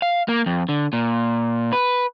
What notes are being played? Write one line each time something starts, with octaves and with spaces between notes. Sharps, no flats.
F5
A#3
F2
D3
A#2
B4